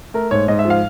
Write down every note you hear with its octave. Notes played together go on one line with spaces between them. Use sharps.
A3 A#4
G#2 C#5
G#2 D#5
E5
F3
F5